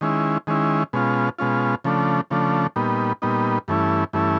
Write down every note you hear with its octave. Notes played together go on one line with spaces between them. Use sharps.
D#3 G#3 C#4 E4
D#3 G#3 C#4 E4
B2 G#3 C#4 F4
B2 G#3 C#4 F4
C#3 F3 A3 D4
C#3 F3 A3 D4
A#2 G3 B3 D#4
A#2 G3 B3 D#4
G2 E3 A3 C#4 E4
G2 E3 A3 C#4 E4